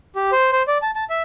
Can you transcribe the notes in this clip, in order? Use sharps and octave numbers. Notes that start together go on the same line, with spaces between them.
G4
C5
C5
D5
A5
A5
E5